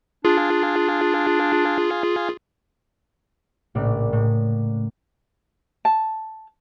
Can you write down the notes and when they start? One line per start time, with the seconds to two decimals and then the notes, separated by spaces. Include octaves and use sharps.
0.25 D4 F4 G#4
3.75 A#1 A2 C#3 D5
4.13 A2
5.85 A5